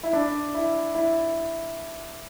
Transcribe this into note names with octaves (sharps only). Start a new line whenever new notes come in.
E4
D4
E4
E4